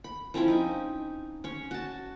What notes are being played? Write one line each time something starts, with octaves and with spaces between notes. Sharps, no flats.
B5
F3 C4 C#4 E4
D#4 G#5
C#4 C#5
F#4 A5